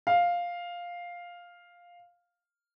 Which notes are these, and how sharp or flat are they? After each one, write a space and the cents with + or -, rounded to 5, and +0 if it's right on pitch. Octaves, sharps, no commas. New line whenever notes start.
F5 +5